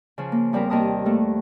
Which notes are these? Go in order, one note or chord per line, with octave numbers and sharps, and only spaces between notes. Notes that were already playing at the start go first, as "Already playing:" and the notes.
C#3 F3
A#3
E2 G3 C4 A#4
D#2 C3 A#4 A5 D#6
A3 A#3 A4